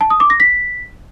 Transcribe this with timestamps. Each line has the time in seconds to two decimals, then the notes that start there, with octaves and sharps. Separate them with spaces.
0.01 A5
0.10 D#6
0.20 D6
0.30 A#6
0.40 B6